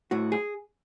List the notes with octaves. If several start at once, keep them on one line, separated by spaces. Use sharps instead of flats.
A2 F#4
G#4